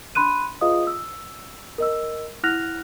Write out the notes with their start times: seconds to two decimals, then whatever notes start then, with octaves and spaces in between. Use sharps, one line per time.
0.15 D4 B5 C6 F#6 D#7
0.61 F4 G#4 B4 D#5 F5 D#6
0.87 E6
1.78 A#4 D#5 E6
2.43 E4 F#5 F6 F#6 A#6 F7